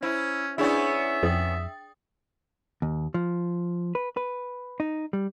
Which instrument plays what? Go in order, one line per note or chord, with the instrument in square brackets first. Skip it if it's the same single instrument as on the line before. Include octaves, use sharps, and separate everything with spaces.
[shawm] C#4 [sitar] E4 [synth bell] C5
[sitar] B3 C#4 E4 [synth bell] D4 G#4 D5 [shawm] E5
[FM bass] F2 [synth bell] G5 D#6 A6
[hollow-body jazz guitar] D#2
F3
B4
B4
D#4
G3